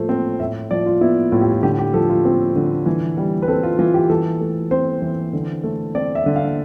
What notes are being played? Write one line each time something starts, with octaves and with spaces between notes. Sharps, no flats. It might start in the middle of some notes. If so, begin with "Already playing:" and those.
Already playing: A2 F3 A3 C5
C4
A2 E5
F3 D5
F4
B3 E4
A2 F4
G4
F4
D3 G4
G4
F3 A4
F4
C4
D3
E3
G3
B4
C4 A4
F4
E3 F4
G4
E3 A4
A3
C4 C5
E3
D3
A3
C4 D5
E5
D3
F5